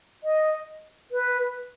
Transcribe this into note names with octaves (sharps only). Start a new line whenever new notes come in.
D#5
B4